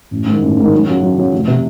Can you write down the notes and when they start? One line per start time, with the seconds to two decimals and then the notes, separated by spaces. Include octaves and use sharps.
0.11 A1
0.26 G#2 D#3
0.42 A1
0.57 G#2 D#3
0.72 F#2
0.87 C#3 F#3
1.02 F#2
1.18 C#3 F#3
1.32 F1
1.48 C3